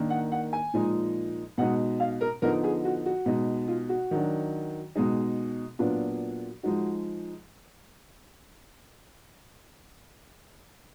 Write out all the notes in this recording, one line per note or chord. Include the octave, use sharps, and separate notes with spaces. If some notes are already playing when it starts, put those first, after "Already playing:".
Already playing: D#3 A#3 D4
F#5
F#5
G#5
A#2 F3 G#3 D#4
B2 G#3 D#4 F#5
F5
A#4
D3 F3 B3 D#4 A#4
G#4
F#4
F#4
B2 G#3 D#4
F4
F#4
D#3 F#3 D4
B2 G#3 D#4 G#4
A#2 F#3 B3 D4 F4
F3 G#3 D#4 F#4